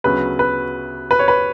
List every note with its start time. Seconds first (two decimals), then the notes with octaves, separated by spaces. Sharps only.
0.04 D2 C#3 F#3 B3 B4
0.39 B4
1.11 B4
1.19 C#5
1.28 B4